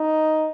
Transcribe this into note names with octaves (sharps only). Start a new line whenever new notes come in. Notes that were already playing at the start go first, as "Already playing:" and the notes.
Already playing: D#4